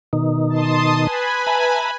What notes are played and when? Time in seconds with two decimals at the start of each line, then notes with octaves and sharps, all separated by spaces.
0.13 B2 D#3 D#4
0.50 A5 C6 D#6
1.01 B4 G#5 B5
1.47 E5 A5 A#5